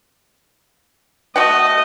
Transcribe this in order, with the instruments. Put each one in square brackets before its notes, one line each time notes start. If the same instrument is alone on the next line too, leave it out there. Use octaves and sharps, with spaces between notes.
[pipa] A3 F#4 F#5 [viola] D#5